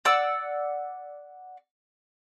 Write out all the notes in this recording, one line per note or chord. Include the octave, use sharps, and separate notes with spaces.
D5 F#5 E6